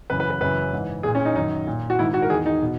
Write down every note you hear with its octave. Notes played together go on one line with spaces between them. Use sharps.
F#2 C#3 E3 B4
B4
B4
F#2 C#3 E3 B4
G#2 E3
A#2 G#4
C#4
D#4
F#2 D#3 D#4
A#2
F#4
G#2 D#3 E4
F#4
A#4
E2 D#3 G#4
D#4
B2